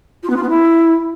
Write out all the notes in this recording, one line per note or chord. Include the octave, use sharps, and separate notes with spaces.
F4
B3
F4
B3
E4